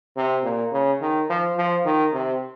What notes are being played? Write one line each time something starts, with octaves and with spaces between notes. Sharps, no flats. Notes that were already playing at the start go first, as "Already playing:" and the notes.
C3
A#2
C#3
D#3
F3
F3
D#3
C3